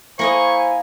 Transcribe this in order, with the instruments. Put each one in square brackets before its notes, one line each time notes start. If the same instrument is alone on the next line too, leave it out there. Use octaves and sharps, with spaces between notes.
[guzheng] A#3 A#4 D#5 [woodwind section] E4 G#5 [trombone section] C5 [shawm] C#6